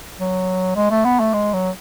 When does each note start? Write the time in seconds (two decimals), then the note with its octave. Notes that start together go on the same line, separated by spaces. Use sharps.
0.20 F#3
0.76 G#3
0.91 A3
1.05 B3
1.20 A3
1.33 G#3
1.53 F#3